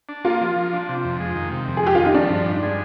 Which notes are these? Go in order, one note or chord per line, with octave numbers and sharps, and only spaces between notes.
D4
A#3 F4
F3
F3
D4
C3
F2
G#3
D#3
C3
F2
G#4
G#3 G4
D#3 F4
D#4
F3 D4
G2
G2
G#3